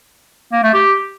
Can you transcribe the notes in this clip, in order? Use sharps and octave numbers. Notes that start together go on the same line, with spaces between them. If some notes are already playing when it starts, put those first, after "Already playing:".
A#3
A3
G4